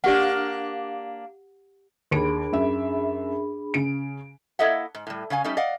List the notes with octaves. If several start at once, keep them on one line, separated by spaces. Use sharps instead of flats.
A#3 D4 G4 F#5
D#2 D4 G#4 B5 D7
F#2 E5
C#3 D7
A#3 E4 A4 D#5 E5 F#5
G#2
A2 G3
C#3 C#4 F5 G#5
G3 A3 C#4 D#4
D5 D#5 F5 F#5